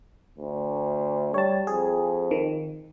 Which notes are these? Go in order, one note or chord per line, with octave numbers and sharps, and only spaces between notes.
D2
G3 C#5 A5
F2 G#4
D#3